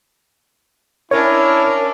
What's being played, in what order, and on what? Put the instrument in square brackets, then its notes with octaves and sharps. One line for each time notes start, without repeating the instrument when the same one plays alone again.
[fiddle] C#4 D4 [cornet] E4 [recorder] A#4 [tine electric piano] C#5